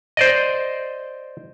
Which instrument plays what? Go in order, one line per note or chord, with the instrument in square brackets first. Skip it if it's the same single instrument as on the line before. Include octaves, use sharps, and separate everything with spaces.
[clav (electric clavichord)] C5 D5 D#5